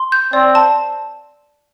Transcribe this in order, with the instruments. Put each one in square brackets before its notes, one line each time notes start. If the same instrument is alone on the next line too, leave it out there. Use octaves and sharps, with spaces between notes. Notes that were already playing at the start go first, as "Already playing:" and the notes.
Already playing: [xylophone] C6
G6
[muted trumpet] C4 [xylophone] D5
[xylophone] A5